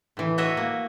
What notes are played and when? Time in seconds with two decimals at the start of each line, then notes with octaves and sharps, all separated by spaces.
0.17 A2 E3
0.38 F#4 C#5 D#5 E5
0.57 A#3